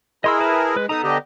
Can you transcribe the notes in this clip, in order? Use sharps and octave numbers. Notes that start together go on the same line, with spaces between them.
E4 G#4 A#4 D#5 C6 E6
B4 A5 B5
G#3 B4
B3 D#4 A4 A#5 D#6
D3 G4 D#5